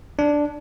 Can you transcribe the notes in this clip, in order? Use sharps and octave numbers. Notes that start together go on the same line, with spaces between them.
D4